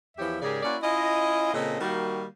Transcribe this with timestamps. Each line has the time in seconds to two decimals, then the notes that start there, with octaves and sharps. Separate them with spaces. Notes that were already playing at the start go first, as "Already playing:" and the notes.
0.17 E2 E3 F3 G4 C#5 E5
0.42 G#2 C#3 G4 G#4 A#4 D5
0.63 A#3 C#4 E4 F#4 D5
0.82 C#4 E4 F4 D#5
1.54 A#2 C#3 C4 A4 D#5
1.80 D#3 G3 A#3 F#4